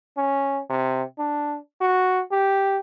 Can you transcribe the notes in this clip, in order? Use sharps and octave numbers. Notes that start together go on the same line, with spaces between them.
C#4
C3
D4
F#4
G4